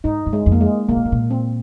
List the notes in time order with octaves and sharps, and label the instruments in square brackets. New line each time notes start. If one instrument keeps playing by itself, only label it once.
[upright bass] G#2 [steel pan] D#4
[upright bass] G2
[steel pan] G#3
[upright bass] F2
[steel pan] A#3
G#3
[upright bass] C3 [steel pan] A#3
[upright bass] A#2
G#2
A#2
[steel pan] C4